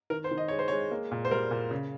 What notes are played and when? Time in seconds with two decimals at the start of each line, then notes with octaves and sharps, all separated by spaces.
0.10 D#3 A#4
0.24 C5
0.31 D#3
0.38 D#5
0.48 G#3 C#5
0.59 C5
0.68 G#3 C#5
0.91 A#3
1.11 A#2
1.25 C5
1.31 G3 A#4
1.51 A#2
1.71 C#3